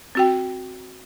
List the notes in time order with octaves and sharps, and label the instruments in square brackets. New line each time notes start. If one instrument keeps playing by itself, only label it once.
[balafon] C4 F#4 G5